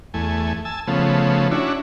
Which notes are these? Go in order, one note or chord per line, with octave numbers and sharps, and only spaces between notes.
E2 A3 G#5
G#5 A5 E6
C#3 F3 A3 B3
C#4 D4 E4 F#4